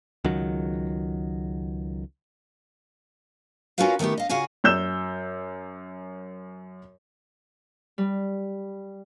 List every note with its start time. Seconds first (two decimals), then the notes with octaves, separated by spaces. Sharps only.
0.24 C#2 D#3 F#3
3.78 C#4 F4 F#4 A#4 B4 F5
3.99 D#3 A3 B3 E4 G4
4.18 D#5 F5
4.29 C#3 F4 F#4 F5 F#5 G#5
4.64 F#2 E6 G6 E7
7.98 G3